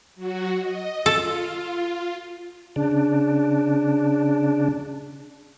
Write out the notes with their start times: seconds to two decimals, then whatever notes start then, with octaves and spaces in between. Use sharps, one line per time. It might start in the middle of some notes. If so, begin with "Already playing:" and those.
0.15 F#3 F#4
0.59 D#5
1.06 F4 A4
2.76 C#3 D4